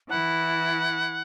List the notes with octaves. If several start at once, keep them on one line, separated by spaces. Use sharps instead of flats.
E3 E4 F#5